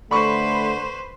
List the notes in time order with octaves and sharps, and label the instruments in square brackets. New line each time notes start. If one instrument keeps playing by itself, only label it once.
[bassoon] D3 [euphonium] A3 [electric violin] B4 C5 [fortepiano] B5 C#6